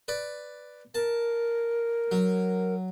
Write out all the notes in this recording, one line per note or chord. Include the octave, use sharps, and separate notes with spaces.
B4 D5
A#4 A5
F#3